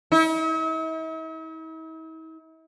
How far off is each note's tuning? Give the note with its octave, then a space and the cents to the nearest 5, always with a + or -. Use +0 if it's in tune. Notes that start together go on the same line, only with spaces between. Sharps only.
E4 -45